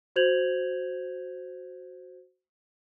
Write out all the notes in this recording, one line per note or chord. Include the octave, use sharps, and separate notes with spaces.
F#4 C5 G6 G#6 F7 F#7